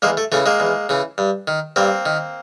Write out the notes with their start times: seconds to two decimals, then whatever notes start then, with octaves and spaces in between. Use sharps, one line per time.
0.02 E2 G#3 A#3
0.17 A3
0.32 C#3 E3 A3
0.46 G#3 A#3
0.60 E2
0.89 C#3 E3
1.18 G2
1.48 D#3
1.76 G2 A#3 C4
2.06 D#3